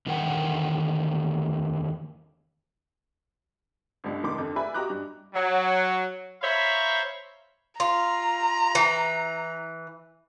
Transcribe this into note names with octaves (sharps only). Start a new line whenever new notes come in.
E2 D3 D#3 A#4 F#5 G5
G1 C#2 G2
F1 C#2 D#3 C6 D6
F2 D3
B4 D5 E5 G#5 B5
F#4 G4 D#5 A#5 D6 F#6
G2
F#3
C5 C#5 E5 F5 A#5 B5
F4 A#5
E3